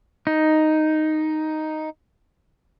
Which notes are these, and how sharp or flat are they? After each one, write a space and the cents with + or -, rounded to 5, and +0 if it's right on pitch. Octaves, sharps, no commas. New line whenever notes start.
D#4 +0